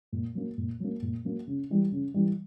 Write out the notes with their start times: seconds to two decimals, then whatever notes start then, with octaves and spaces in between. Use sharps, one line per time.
0.12 A#2
0.35 F#3 A#3
0.58 A#2
0.80 F#3 A#3
1.02 A#2
1.25 F#3 A#3
1.47 C#3
1.70 E3 G3
1.92 C#3
2.14 E3 G3